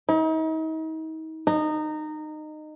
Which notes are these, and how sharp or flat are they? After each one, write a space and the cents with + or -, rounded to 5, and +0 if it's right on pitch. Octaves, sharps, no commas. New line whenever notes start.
D#4 +40
D#4 -20